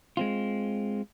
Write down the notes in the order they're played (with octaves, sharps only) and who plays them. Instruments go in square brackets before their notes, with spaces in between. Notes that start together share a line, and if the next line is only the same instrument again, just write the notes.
[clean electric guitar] G#3 C4 F4